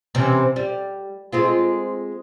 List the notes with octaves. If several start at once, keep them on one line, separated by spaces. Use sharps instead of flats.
C3 E3 C#4
G3
G#3 C4 F4